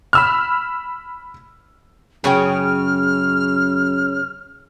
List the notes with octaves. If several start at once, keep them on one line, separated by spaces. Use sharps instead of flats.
B5 E6 F6
F#2 C#3 C#4 G#4 C#5 G5 F6